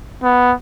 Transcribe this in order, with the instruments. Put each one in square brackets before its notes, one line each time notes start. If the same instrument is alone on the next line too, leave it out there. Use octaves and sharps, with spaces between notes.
[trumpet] B3